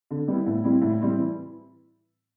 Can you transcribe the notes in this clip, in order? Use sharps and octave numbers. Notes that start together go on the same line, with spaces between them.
D3
G3 B3 E4
A2
G3 C4 E4
A2
G3 C4 E4
E3